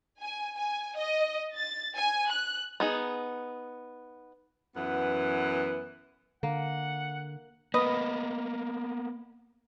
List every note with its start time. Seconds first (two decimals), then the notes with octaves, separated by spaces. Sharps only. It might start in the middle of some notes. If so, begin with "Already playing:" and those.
0.21 G#5
0.56 G#5
0.96 D#5
1.55 A6
1.95 G#5
2.30 F#6
2.80 B3 D#4 G#4
4.75 F#2 E3 B3 F#5
6.43 D3 A#3 F#5
7.74 A#3 B3 B4 D#5